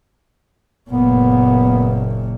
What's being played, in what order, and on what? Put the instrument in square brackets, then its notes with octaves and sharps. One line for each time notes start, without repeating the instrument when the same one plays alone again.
[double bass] F#1 A#2 [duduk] B3